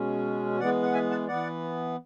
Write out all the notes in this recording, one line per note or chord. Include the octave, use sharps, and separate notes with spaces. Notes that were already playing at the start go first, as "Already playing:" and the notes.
Already playing: B2 G#3 C#4
E3 G#3 B3 D5 F#5
F#5
E5 G#5
F#5 A5
E3 B3 D5 F#5